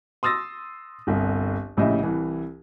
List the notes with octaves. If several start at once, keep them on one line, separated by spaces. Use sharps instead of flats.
C6 D#6 E6 A6 A#6
G1 C2
A#1 A2 C#3 G4 D#5 E5
C2 E3